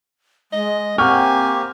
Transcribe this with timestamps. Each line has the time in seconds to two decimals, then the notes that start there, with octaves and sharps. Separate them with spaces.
0.52 G#3 D#5
0.98 A#3 C4 G4 F#5 G#5 C#6 F6